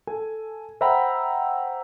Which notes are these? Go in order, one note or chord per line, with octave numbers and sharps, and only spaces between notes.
A4 G#5
C5 E5 F#5 G5 A#5 B5